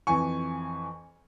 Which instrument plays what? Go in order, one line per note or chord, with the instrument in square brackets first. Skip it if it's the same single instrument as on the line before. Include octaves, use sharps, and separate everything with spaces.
[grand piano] F2 E3 G#5 C#6